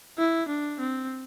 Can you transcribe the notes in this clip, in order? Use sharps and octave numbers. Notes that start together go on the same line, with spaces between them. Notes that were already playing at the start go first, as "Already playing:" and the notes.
E4
D4
C4